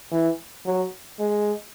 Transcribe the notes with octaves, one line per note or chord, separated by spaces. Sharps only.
E3
F#3
G#3